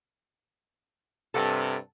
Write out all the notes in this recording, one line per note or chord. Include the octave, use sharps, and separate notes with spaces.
G2 C3 A4 F#5